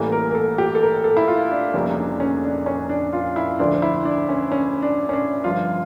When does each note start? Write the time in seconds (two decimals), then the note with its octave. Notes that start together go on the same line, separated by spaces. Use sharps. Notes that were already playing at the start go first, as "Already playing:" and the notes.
Already playing: A1 A2 E3 G3 A#3 A4
0.12 A#4
0.31 A#4
0.35 A4
0.58 G4
0.75 A4
0.82 A#4
1.04 A4
1.17 E4
1.28 F4
1.51 D4
1.74 F1 F2 C#3 G3 A#3 C#4
1.97 D4
2.20 C#4
2.44 D4
2.66 C#4
2.89 D4
3.13 F4
3.36 E4
3.59 D2 D3 F3 D4
3.82 E4
4.05 D4
4.29 C#4
4.52 C#4
4.82 D4
5.09 C#4
5.13 D4
5.44 G1 G2 F3 F4